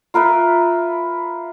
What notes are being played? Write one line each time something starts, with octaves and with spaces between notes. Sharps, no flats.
F4 A#4 B4 E5